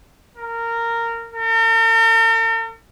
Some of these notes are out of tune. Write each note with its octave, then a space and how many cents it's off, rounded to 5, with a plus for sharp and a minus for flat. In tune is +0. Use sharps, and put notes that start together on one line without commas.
A#4 -15
A#4 -45